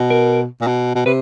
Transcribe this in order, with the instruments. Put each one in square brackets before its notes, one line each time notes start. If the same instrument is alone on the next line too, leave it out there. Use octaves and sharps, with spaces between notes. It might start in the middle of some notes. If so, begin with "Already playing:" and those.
Already playing: [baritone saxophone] B2
[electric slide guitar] A#4
[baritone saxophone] A#2
B2
B2
[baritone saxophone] C3 [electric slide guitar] B4